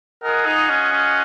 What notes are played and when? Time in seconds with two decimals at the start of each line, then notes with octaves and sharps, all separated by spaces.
0.23 F4 G#4 A#4 D#5 F#5
0.45 D#4
0.70 C#4
0.92 C#4